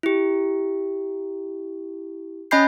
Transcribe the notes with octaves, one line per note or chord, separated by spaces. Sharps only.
E4 G4
C#4 D#5 G#5 B5 G6 C7